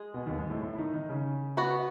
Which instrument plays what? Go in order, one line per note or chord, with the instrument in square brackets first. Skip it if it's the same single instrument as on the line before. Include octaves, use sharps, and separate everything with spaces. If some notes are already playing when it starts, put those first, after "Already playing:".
Already playing: [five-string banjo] G#3 G#4
[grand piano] B2 B3
D#2 D#3
G#2 G#3
A2 A3
A2 A3
E4
D#3 D#4
D#3 D#4
C#3 C#4
[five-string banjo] B3 F#4 B4